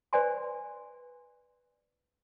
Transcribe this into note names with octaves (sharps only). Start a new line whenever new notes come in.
B4 C5 D5 G#5 C6